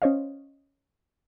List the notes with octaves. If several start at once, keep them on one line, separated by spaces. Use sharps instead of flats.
C#4 C5 C#5 D#5 F5